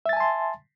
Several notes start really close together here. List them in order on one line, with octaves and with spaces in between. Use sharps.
E5 A6 G#5 A5 C6